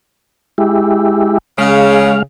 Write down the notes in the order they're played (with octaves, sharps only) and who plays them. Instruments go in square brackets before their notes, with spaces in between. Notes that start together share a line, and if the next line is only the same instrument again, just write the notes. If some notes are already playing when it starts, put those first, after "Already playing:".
[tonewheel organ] G#3 E4 G4
[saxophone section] C#3 [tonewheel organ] G#3 F5